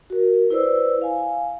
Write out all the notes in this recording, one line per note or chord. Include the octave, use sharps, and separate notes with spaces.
F#4 A#4
E4 B4 C5 D5 E6
F5 G#5